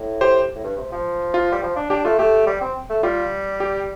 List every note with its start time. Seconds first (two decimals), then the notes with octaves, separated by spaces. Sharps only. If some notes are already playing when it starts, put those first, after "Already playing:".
Already playing: A2
0.21 G4 C5
0.55 A2
0.64 G2
0.77 C3
0.92 F3
1.34 F4
1.52 G3
1.63 F3
1.76 D4
1.90 D4 G4
2.05 A3 F4
2.19 A3 G4
2.47 G3
2.61 C4
2.90 A3
3.03 G3 F4
3.60 G4